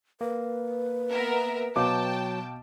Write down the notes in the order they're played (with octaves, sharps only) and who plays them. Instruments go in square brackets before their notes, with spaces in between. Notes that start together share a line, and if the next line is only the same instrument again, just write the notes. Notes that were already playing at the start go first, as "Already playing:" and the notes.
[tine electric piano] A#3 [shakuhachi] B4
[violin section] B3 A#4 E5
[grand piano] B2 F5 D6 [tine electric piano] F#3 [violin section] G5 A5